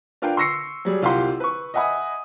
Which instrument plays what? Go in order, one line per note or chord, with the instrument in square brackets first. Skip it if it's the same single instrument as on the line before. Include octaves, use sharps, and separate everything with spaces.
[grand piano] D4 F4 A#4 B4 G5
C6 C#6 E6 A#6 C7 C#7
F#3 G3 G#4
C2 F4 G4 F#5 C6
B4 C#6
D#5 E5 F#5 G#5 B5 D#6